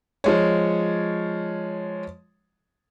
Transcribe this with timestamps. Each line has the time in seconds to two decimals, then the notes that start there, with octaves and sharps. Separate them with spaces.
0.24 F3 G#3 C#5